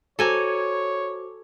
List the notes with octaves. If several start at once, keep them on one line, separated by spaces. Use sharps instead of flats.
F#4 A4 C5 C#5 G#5 A#5 D6